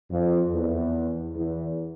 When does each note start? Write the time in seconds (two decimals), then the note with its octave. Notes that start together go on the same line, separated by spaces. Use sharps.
0.11 F2
0.52 E2
1.35 E2